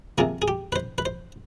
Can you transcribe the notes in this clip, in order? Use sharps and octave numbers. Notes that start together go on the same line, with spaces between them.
C3 F3 A#3 G#4
G#4
G4
B4
C5
B4
C5